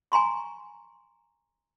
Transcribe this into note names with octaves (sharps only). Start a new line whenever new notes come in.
G#5 A#5 C6 C#6